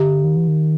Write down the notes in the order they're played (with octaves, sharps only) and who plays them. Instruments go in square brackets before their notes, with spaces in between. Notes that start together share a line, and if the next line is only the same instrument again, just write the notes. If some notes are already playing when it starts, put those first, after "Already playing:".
Already playing: [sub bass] D3 [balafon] G4
[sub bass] D#3
E3
D#3